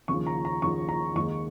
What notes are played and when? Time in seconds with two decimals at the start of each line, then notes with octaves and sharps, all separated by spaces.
0.08 D#2 C#3 F3 C#6
0.26 A#5
0.45 A#5
0.62 D#2 C#3 F3 C#6
0.89 A#5
1.16 D#2 D#3 G#3 D#4 C#6